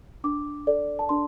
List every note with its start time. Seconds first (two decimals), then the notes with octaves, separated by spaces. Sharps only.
0.24 D4 D6
0.67 A4 D5
0.99 A5
1.09 D4 C6